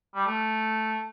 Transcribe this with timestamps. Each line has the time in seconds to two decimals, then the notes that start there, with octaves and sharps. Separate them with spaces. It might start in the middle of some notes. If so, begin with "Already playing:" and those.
0.15 G3
0.26 A3